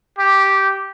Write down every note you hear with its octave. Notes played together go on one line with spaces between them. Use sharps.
G4